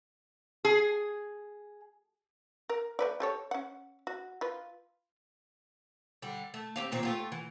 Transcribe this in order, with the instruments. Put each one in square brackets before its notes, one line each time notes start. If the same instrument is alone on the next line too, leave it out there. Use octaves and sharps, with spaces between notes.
[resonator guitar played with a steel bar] G#4
[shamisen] A#4
A3 B4 D5
G4 A4 C#5
C#4 F#5
F#4
F4 B4
[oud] D3 G3
A3
C4 G4 F5
D#2 A#2 C4
A3 F4 G4
E3